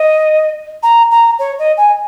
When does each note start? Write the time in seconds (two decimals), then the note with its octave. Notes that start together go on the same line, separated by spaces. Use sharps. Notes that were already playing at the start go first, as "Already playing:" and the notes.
Already playing: D#5
0.83 A#5
1.11 A#5
1.39 C#5
1.59 D#5
1.77 G#5